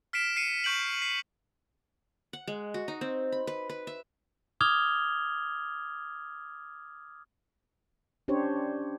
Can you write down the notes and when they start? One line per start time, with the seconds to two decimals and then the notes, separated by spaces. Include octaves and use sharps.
0.13 F6 B6 C7 D7 E7
0.36 C7 C#7 D#7
0.64 C#6 G6 D7 F#7
1.02 C7
2.33 F#5
2.47 G#3
2.74 F#4
2.88 D#4
3.01 C4
3.32 B5
3.47 B4
3.70 B4
3.87 E5
4.61 D6 D#6 F6 G#6 F7 G7
8.28 C#4 D4 G4 C5 C#5